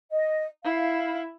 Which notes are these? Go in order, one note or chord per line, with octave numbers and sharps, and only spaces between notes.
D#5
E4 F5